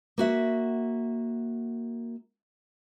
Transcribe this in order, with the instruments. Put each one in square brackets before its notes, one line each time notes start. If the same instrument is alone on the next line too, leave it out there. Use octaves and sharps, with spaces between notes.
[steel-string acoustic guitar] A#3 F#4 E5